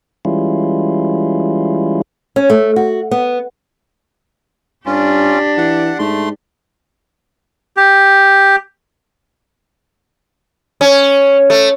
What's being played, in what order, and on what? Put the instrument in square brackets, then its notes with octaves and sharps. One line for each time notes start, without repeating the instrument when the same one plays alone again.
[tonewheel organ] E3 G3 G#3 C#4 E4 F4
[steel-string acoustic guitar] C#4
A3
F#4
B3
[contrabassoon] G2 [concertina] C#4 F4 [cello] D4 G4
[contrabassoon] E3 [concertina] F#5
[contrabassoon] G#2 [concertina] A3 C6
[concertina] G4
[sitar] C#4
A3